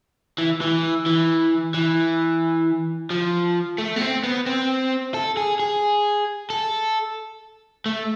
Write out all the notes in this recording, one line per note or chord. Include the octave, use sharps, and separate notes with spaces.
E3
E3
E3
E3
F3
A3
B3
C4
B3
C4
A4
G#4
G#4
A4
A3